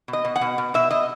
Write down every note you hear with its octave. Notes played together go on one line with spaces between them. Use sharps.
B2
D#5
B2
F#5
B2
B2
B2 E5
B2 D#5